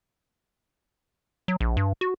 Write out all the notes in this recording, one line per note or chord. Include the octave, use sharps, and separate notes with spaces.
F#3
A#1
G2
F#4